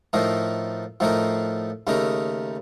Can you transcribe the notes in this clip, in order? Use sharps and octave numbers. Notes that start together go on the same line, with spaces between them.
A2 F3 A3 D#4 A#4
A2 F3 A3 D#4 A#4
D#2 C#3 A3 D#4 A#4